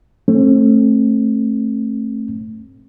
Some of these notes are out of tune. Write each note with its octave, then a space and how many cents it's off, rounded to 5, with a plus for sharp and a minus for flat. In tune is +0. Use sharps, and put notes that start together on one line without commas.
A3 +0 C4 +40